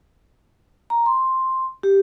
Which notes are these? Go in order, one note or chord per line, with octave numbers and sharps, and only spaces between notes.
A#5
C6
G4